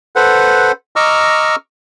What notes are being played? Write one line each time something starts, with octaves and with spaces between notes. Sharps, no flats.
A4 B4 C5 F#5
D#5 A#5 C#6 D6 E6 F6